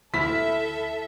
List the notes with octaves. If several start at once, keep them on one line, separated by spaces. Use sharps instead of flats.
D2 E4 A4 E5 B5 F6 B6